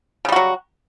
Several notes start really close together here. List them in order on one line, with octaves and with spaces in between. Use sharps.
C#3 G3 F#4 F#3